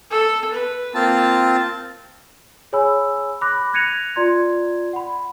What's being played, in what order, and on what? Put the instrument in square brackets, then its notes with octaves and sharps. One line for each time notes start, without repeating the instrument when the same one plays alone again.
[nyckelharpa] A4
B4
[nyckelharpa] A#3 [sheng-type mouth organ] C4 F4 A5
[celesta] G#4 C#5 G#5 B5 E6
B5 D6 F#6 A#6
F#6 G#6 A#6 C#7 D#7 F7
F4 D5 A#5 C6 G#6
F#5 B5